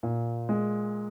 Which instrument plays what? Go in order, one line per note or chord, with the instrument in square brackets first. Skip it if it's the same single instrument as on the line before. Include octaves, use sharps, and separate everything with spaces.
[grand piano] A#2
G#3